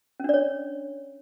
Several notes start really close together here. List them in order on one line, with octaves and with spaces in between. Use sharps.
C#4 D4 D5 C#5